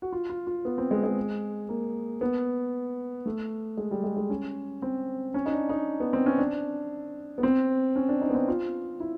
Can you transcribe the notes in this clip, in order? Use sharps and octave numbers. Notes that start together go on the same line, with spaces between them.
F#4
F4
F4
F4
B3
C4
G#3
G#3
A#3
B3
A3
G#3
G3
G#3
G#3
C#4
C4
C#4
D#4
D4
D#4
B3
C4
C#4
D4
B3
C4
C#4
D4
D#4
B3
C4
F4
E4